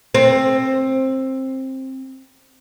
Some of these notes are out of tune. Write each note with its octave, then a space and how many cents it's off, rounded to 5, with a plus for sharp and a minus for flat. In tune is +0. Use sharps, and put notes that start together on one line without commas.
C4 +15